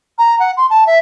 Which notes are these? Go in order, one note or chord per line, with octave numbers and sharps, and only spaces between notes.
A#5
F#5
C6
A5
E5